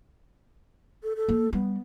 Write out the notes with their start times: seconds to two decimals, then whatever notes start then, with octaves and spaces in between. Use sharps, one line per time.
1.03 A4
1.16 A4
1.29 A#3
1.53 G3 B3